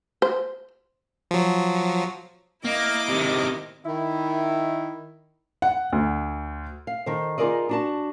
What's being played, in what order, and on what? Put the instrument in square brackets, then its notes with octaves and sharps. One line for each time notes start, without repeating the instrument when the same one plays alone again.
[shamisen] C5
[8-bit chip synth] F3 F#3
[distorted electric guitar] A#3 [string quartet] E4 D#5 D6
[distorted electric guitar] C3 D#3
[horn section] D#3 E4
[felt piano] F#5
D2
[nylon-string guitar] F5
D#3 A4 C5
D#4 F4 G#4 A#4 D5 D#5
D4 F#4 A5